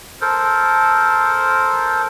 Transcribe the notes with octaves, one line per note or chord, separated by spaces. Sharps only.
A4 A#4 C5